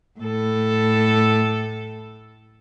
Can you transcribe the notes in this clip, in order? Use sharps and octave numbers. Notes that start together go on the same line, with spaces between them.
A2 A4